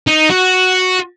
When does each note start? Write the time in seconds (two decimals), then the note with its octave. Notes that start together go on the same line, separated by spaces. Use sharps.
0.07 D#4
0.30 F#4